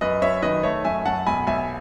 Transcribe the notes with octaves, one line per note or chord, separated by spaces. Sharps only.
F#2 B4 D#5
F#2 C#5 E5
D#3 B4 D#5
A3 C#5 E5
F#2 E5 G#5
F#2 F#5 A5
B1 G#5 B5
B1 E5 G#5